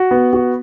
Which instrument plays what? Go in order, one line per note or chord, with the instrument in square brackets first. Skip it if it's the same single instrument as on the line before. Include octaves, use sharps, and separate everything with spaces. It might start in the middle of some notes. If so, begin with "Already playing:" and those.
Already playing: [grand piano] F#4
B3
F#4